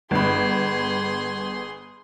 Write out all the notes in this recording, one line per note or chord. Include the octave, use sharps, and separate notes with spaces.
G1 G#4 B5 C6